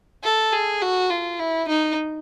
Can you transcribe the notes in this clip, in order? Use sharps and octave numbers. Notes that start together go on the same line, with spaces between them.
A4
G#4
F#4
F4
E4
D#4